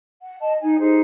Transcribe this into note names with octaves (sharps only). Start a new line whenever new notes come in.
F#5
D#5 A5
D#4 G#5
D#4 G4 G#4 C5